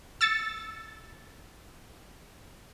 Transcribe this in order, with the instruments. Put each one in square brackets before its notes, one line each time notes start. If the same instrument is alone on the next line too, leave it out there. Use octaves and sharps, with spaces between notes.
[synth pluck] E6 A6 C#7